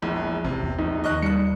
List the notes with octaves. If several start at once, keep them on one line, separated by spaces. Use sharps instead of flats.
E1 A#1 E2
A1 C3
E2
A#1 D#4
D#2 D#5 C#6 F#6
G3 F#6 C#7